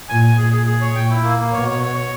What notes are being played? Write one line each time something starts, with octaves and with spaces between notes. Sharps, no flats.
A#2 G#5
G#5
A#2 G#4
G#4
G#4
C#5
A#2 G5
E4
A#3
A#3
B2 C#5
C#5
C#5
C#5